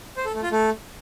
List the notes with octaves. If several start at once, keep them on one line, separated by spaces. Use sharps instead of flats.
C5
A4
A3
F4
A3